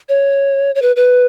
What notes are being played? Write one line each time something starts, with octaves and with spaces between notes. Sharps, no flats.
C#5
C#5
B4
B4